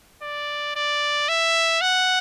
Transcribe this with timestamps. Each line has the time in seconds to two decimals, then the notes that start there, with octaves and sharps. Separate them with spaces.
0.22 D5
0.76 D5
1.29 E5
1.81 F#5